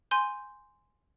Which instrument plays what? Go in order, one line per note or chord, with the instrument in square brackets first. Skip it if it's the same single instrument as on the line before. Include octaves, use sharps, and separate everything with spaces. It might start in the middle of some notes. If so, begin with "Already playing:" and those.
[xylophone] G#5 C6 G6